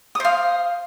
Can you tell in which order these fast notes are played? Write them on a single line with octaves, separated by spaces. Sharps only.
D#6 C5 F5